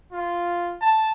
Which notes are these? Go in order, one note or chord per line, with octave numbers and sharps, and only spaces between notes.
F4
A5